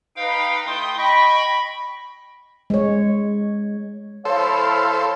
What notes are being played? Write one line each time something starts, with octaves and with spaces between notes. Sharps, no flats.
D#4 B4 F5 G5
A3 E4 G5 C6 D#6
D#5 G5 B5 C#6
G#3 C#5
E4 A4 C5 C#5 F5